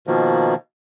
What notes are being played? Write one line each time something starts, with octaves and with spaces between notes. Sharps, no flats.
B2 D#3 F3 A#3